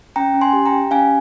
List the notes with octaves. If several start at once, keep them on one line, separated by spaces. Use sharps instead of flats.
C#4 G5 A#5
C#4
G#5 C6
G4
G5 A#5
G4
C#4 F5 G#5